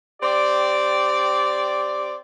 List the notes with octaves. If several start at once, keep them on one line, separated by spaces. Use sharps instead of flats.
C4 G4 D5